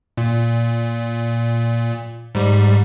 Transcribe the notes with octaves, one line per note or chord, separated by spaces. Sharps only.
A#2
G#2 G3